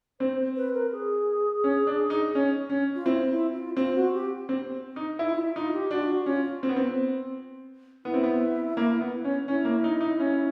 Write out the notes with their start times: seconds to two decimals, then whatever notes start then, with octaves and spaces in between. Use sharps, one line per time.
0.20 C4 C5
0.56 B4
0.74 A#4
0.92 G#4
1.64 C#4
1.87 D4
2.10 D#4
2.35 C#4
2.70 C#4
2.95 F4
3.06 C4 E4
3.30 E4
3.54 F4
3.77 C4 F4
3.95 F#4
4.13 G4
4.49 C4
4.96 D#4
5.19 D#4 E4
5.30 F4
5.38 E4
5.56 D#4 F4
5.73 G4
5.91 D4 F#4
5.99 F4
6.07 F#4
6.26 C#4 F4
6.63 C4
6.69 B3
6.76 C4
8.05 B3 E4
8.14 C4
8.23 B3
8.77 A#3
9.01 B3
9.25 C#4
9.48 C#4 E4
9.65 A#3
9.84 D#4
10.01 D#4
10.20 C#4